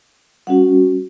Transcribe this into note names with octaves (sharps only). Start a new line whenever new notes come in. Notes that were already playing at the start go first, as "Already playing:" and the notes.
G3 C#4 F#4 F#5